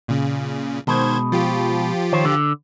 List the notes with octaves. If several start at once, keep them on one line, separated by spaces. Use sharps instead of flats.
A#2 C#3
B2 D#3 G#3 C5 G#6
F3 F4 G4
D#3 C5 C#5
D3